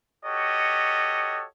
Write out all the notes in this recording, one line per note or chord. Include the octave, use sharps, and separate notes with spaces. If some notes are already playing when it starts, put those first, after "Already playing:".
F#4 G4 A4 C#5 D#5